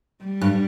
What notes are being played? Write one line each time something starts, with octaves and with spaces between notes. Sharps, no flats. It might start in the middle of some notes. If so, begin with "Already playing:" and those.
G3
G2